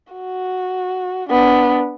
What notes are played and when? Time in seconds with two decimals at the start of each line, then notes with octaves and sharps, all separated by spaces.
0.13 F#4
1.30 B3 D4